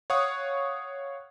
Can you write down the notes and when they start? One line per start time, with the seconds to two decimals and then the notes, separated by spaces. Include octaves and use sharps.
0.10 C#5 F5 F#5 C#6 D#6